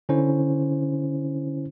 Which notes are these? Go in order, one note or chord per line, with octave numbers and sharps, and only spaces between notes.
D3 C#4 E4 C5